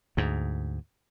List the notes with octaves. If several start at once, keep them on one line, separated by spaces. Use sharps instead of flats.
D2 G#2